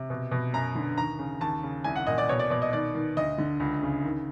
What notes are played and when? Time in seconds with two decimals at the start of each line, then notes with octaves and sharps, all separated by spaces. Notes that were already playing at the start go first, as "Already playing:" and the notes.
Already playing: C3
0.10 B2
0.31 B2
0.54 F#2 A#5
0.75 D3
0.98 D#2 A#5
1.19 C#3
1.41 D#2 A5
1.63 C#3
1.84 C2 G#5
1.96 F#5
2.07 A#2 D#5
2.18 D5
2.29 B2 C#5
2.39 D5
2.50 B2 D5
2.62 D#5
2.73 D#3 D5
2.95 D#3
3.17 D2 D#5
3.38 D3
3.60 C#2
3.83 C#3
4.04 D#3